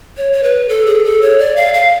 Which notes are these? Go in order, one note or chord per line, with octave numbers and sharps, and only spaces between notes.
C#5
C#5
B4
A4
G#4
A4
C#5
D5
F5
F5